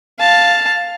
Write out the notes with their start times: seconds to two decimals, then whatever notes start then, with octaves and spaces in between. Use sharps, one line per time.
0.20 F5 A5